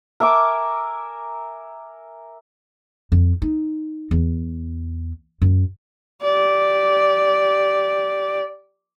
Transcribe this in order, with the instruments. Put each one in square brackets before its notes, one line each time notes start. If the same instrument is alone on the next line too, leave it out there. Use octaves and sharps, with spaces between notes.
[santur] A#4 E5 G#5 D6
[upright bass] F2
D#4
E2
F#2
[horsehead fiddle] G4 D5